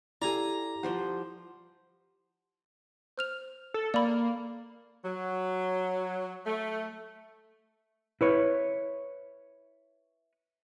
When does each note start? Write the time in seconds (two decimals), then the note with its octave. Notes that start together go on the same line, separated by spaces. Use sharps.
0.22 E4 G4 A4 D5 F5 G#5 A#5
0.83 F3 G3 C5 F#5
3.18 C5 F6 F7
3.74 A4
3.94 A#3 D5 B5
5.04 F#3
6.45 A3
8.21 E4 B4 C#5